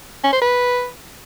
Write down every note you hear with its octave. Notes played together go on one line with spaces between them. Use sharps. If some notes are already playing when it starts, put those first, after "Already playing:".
C#4
C5
B4